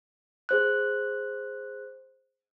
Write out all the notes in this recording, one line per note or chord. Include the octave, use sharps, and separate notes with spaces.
G#4 C5 F#6